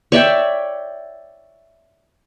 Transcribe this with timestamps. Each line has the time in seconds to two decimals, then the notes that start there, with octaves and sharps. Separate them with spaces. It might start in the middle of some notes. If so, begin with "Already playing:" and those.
0.12 C#5 D5 E5 G5